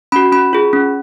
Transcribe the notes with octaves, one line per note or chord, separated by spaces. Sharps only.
C#4 F#4 B5
C#4 B5
F4 G#4
C#4